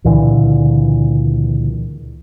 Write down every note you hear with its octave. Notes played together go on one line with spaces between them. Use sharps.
C#2 A#2 D3 E3